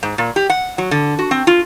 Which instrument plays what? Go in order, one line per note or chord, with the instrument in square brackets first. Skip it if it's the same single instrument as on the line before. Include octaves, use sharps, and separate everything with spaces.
[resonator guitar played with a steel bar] G#2
A#2
G4
F#5
F#3
D3
F#4
C4
F4